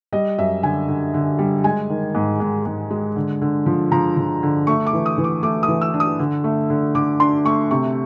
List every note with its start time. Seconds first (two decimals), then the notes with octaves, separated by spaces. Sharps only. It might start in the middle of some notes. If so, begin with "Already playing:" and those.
0.13 G3 D#5
0.38 F#2 E5
0.63 D3 G#5
0.88 D3
1.14 D3
1.39 G3
1.64 G#3 G#5
1.90 D#3
2.15 G#2
2.40 G#2
2.66 G#2
2.90 G#3
3.16 D3
3.41 D3
3.66 F3
3.92 F3 A#5
4.17 F3
4.43 D3
4.67 A3 C#6
4.87 D6
4.93 E3
5.06 D#6
5.18 E3
5.24 D6
5.43 A3 D6
5.63 D#6
5.68 E3
5.81 E6
5.94 D4
6.00 D#6
6.19 D3
6.44 A3
6.70 D3
6.95 D3 D6
7.20 D4 C6
7.45 A3 C#6
7.71 C3 C#6